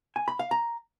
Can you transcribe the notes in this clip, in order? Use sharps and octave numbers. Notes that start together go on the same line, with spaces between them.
G#5
B5
F5
A#5